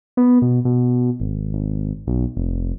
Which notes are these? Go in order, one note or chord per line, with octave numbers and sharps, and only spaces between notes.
B3
B2
B2
G#1
G#1
B1
F1